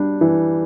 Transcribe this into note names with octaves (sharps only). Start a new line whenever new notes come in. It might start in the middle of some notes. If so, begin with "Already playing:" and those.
Already playing: G3 D4
E3